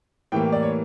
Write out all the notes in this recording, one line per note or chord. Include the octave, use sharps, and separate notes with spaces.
A2 E3 G3 A#3 G5
D5
C#5